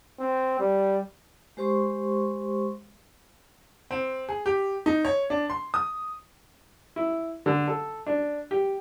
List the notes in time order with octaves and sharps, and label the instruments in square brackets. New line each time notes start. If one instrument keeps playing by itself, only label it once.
[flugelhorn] C4
G3
[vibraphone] G#3 G4 C5 C6 C#6
[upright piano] C4
G#4
G4
D#4
C#5
D4
C6
D#6
[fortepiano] E4
D3
A4
D4
G4